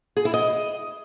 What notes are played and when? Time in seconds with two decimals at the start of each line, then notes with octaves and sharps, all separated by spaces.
0.17 G#4
0.25 E4
0.34 D#5